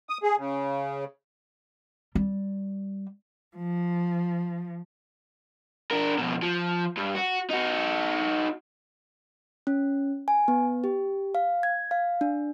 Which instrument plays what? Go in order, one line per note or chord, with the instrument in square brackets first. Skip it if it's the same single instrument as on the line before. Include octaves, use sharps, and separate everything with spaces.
[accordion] D#6
G#4
C#3
[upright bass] G3
[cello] F3
[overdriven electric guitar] D4 A#4
F2 B2
F3
G2
F#4
D#4 F#4
[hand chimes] C#4
G#5
B3
G4
F5
G#6
F5
D4